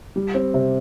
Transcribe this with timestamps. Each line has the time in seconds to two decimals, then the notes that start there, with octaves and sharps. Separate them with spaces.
0.16 G3
0.34 C4
0.54 C3